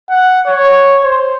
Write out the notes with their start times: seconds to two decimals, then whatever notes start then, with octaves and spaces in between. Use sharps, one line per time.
0.10 F#5
0.47 C#5
1.03 C5